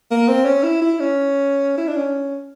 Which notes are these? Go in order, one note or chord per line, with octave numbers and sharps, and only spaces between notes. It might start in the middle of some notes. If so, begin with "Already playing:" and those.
A#3
C4
C#4
E4
E4
C#4
E4
D4
C#4